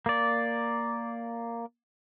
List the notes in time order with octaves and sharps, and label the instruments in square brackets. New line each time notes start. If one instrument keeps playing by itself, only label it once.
[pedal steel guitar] A#3 D5